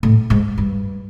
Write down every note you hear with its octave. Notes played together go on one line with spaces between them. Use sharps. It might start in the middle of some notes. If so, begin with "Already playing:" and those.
A2
G#2
G2